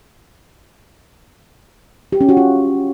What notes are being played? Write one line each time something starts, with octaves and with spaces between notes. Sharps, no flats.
G4
C#4
F#4
F4